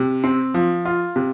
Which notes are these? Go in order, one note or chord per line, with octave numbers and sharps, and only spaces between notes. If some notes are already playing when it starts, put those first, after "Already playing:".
Already playing: C3
C4
F3
F4
C3